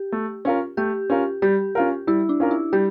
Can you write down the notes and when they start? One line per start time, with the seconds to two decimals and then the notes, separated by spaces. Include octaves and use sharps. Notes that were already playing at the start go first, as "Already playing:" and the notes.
Already playing: G4
0.12 A3
0.45 C#4 F4 A#4
0.77 A3 G4
1.10 C#4 F4 A#4
1.42 G3 G4
1.75 C#4 F4 A#4
2.07 G3 E4
2.29 D4
2.40 C#4 F4 A#4
2.51 E4
2.73 G3 G4